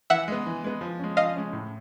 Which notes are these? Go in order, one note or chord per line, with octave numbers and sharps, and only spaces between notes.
E3 E5 F#5
G#3 B3
E3
G#3 B3
F3
G#3 C#4
F3 D#5 F5
G#3 C#4
A2